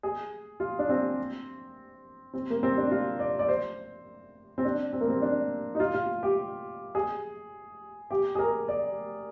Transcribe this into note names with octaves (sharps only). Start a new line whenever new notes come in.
G#4
F4
D4
C4
C4
A#3
C4
D4
F4
D5
D5
C5
C4
D4
C4
A#3
C4
D4
D#4
F4
F4
G4
G#4
G4
G#4
A#4
D5